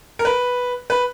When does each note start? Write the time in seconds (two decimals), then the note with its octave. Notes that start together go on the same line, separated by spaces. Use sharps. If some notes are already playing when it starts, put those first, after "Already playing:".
0.19 A#4
0.25 B4
0.90 B4